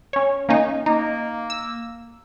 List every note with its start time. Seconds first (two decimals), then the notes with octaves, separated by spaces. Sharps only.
0.13 C#4 C#5
0.49 A#3 C#4 D#4
0.86 A#3 D#4
1.50 E6